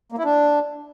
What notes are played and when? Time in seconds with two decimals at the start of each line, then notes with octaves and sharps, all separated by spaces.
0.12 A#3
0.18 E4
0.24 D4